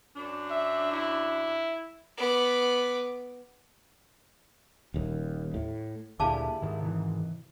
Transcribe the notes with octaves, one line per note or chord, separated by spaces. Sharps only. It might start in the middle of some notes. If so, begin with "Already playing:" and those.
F#2 D4
E5
E4
B3 D6
D#1 D#2
A2
D2 A#2 E4 G4 G#4 F5 A5 D6
G#2 D#3
C3 E3